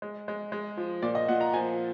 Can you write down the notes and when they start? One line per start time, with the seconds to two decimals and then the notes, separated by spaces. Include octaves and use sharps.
0.02 G#3
0.28 G#3
0.52 G#3
0.77 F3
1.02 A#2 D5
1.15 D#5
1.28 A#2 F#5
1.41 A#5
1.54 F3 G#5